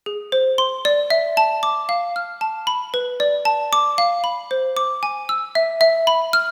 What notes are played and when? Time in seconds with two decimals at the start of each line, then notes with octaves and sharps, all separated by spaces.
0.06 G#4
0.32 C5
0.58 C6
0.85 D5
1.10 E5
1.37 A5
1.63 D6
1.89 F5
2.16 F6
2.41 A5
2.67 B5
2.94 B4
3.20 D5
3.45 A5
3.73 D6
3.98 F5
4.24 B5
4.51 C5
4.77 D6
5.03 G#5
5.29 E6
5.55 E5
5.81 E5
6.07 B5
6.33 F6